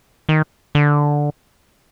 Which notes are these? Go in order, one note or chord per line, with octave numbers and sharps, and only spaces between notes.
D#3
D3